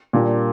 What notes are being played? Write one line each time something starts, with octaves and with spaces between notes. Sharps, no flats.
A#2 G3 A#3 D4